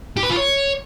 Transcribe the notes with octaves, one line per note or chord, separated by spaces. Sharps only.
G4
B4
F4
C#5